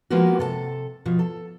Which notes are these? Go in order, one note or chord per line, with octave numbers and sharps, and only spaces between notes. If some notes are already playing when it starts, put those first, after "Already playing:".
F3 G#3 A#3 B3 C#4 F#4
C3 A4 D5 A5
B2 F3
A4